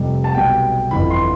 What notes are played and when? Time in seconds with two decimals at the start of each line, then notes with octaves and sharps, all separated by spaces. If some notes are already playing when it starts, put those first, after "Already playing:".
Already playing: F1 F2 C3 G3
0.24 A5
0.35 B1 B2 G3 G5
0.91 G1 F2 E3 B5
1.10 C6